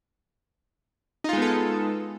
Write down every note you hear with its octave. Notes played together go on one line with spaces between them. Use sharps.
G#3 B3 D#4 F4 A4